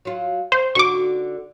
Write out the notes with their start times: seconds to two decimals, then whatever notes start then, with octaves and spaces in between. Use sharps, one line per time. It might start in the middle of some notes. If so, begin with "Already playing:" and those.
0.05 F#3 F4
0.52 C4 C5
0.75 D3 D#4 F#4 C#6 D6